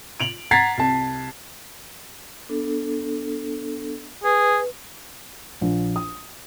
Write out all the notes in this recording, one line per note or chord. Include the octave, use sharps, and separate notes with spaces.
D7 F7 F#7
F#5 A#5 G#6 A6 B6 C7
C2 A5
B3 D4 A4
G#4 B4
A#1
D#6